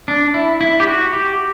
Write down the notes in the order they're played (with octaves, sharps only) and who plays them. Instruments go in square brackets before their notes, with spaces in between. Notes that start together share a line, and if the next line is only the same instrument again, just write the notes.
[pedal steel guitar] D4
E4
E4
G4
F#4
G4